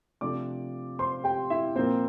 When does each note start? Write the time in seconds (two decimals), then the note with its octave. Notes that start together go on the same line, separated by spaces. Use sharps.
0.21 C3 F3 A3 D4 D5 D6
0.99 C5 C6
1.24 G4 G5
1.50 E4 E5
1.76 A#2 F3 A#3 C4 C5